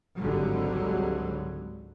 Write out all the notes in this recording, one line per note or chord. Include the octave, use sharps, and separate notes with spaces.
G#1 C#2 G#2 D3 F#3 G3